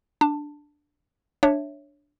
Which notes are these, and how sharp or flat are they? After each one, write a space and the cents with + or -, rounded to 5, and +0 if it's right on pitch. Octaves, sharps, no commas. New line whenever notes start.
D4 +0 A5 +15
D4 +0 C#5 -5 E5 +0